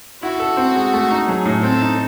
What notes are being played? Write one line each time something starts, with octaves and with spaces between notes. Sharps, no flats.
E4 F#4
A4
C4
G#3
A3
D#4
F#3 G#4
A2
C4 A4
D#4